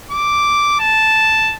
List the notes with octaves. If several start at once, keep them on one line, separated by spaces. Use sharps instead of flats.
D6
A5